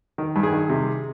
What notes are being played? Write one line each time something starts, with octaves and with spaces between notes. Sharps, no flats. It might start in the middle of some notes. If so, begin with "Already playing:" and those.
D#3
G2
G#4
D#3
C3